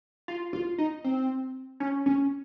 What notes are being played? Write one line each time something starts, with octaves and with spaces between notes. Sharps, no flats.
F4
F4
D#4
C4
C#4
C#4